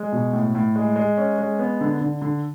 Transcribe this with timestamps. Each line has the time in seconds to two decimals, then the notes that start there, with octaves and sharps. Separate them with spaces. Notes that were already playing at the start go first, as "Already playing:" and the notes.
Already playing: G#3
0.12 B2
0.33 A2
0.55 A2
0.76 G#3
0.96 G#3
1.17 C#4
1.38 G#3
1.59 B3
1.81 D3
2.01 D3
2.22 D3